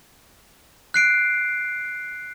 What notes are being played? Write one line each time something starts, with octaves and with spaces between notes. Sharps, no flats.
F#6 C7 D7